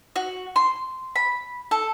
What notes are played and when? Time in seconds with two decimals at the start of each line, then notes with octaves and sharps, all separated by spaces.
0.16 F#4
0.56 C6
1.16 B5
1.71 A4